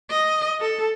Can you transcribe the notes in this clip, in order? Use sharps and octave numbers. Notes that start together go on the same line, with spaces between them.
D#5
A4